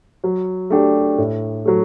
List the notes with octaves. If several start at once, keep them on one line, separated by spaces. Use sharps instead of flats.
F#3
A3 D4 G4
A2
F#3 A3